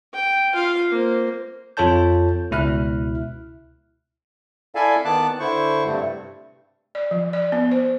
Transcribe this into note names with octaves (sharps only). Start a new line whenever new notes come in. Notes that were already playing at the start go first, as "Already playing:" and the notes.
G5
F4 F5
A#3 C5
F2 F4 A4 C#5 A5 G6
C#2 B2 E4 E5 F6 F#6
E4 A4 D5 E5 F5 G#5
D#3 B3 A5 D6 F#6
D3 E4 C5 C#6
G2 C3 G3 A3
D5
F3
D5
B3
C5